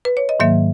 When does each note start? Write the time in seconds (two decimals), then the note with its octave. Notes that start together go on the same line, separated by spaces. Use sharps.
0.05 B4
0.17 C#5
0.29 D#5
0.40 G#2 D#3 F#3 A#3 E5